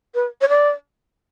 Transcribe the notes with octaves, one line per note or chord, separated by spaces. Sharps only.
B4
C#5
D5